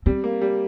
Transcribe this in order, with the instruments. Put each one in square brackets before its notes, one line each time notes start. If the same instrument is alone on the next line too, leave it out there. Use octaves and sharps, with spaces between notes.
[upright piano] G3 [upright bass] C4
[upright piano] A#3
G3